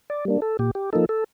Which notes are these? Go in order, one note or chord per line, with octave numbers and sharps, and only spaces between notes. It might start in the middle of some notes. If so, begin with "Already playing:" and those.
D5
G3 A#3 D4
A4
A#2 G4
G4
F3 A#3 D#4 A4
A4